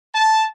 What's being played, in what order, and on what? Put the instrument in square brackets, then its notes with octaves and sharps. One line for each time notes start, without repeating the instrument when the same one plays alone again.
[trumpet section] A5